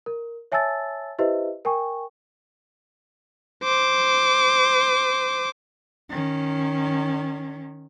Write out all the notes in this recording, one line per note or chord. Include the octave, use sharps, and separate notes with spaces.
A#4
C#5 E5 G#5 A5 E6 A6
E4 G4 B4 C5 D#5 E5
A#4 G5 G#5 C#6
C5 D6
D#3 C#4